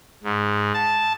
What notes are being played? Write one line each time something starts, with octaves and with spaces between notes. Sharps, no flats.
G#2
A5